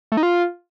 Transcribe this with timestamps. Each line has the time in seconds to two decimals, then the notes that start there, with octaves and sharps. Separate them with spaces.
0.12 A3
0.17 D#4
0.23 F4